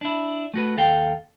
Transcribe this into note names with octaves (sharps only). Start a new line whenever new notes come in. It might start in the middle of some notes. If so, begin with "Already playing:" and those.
D4 E4
A3 F#4 B4
D#2 A4 F5 G5